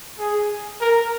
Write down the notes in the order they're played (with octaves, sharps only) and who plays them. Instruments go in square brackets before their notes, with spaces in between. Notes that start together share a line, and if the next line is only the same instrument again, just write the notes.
[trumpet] G#4
A#4